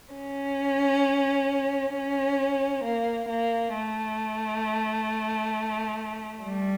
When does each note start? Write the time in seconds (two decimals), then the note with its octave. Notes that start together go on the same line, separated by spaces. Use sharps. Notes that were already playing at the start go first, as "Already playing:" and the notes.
0.14 C#4
1.94 C#4
2.84 A#3
3.29 A#3
3.74 A3
6.43 G3